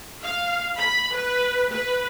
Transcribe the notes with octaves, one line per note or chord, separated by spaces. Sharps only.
F5
B5
B4
B4